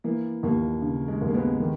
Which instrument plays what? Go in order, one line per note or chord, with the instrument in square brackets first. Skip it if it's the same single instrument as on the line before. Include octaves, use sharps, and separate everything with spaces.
[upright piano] E3 A#3
D#2 A#3
C#3
G#3
D#2
A#3
G#3 B3
D#3